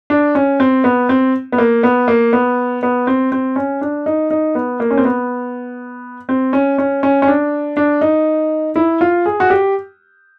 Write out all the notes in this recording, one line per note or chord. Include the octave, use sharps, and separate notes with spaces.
D4
C#4
C4
B3
C4
B3
A#3
B3
A#3
B3
B3
C4
C4
C#4
D4
D#4
D#4
B3
A#3
C#4
C4
B3
C4
C#4
C#4
C#4
C#4
D4
D4
D#4
E4
F4
G#4
F#4
G4